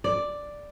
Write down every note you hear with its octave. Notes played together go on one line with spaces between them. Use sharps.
D5